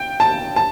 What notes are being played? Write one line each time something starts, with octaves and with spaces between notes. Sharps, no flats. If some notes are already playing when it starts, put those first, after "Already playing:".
Already playing: G5
A5
A5